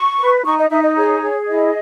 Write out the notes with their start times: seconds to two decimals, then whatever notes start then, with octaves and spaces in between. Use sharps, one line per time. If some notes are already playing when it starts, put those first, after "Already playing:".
Already playing: C#6
0.19 B4
0.45 D#4 C#6
0.58 D#5
0.70 D#4 E5
0.83 D#5
0.96 G#4 C#5
1.22 G#4
1.48 E4 D#5